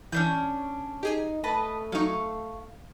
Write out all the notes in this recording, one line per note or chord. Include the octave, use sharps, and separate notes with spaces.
E3 C#4 D4 G6
D#4 G4 G#4 G#5
A3 B4 D#5 A5 A#6
F#3 D#4 F5 C#6